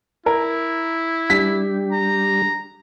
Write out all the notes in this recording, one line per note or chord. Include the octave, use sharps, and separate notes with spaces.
E4 A#4
G3 D4 G4 B6
A#5